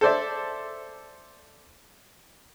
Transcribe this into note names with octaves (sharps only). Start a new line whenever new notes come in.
A4 C5 D5 E5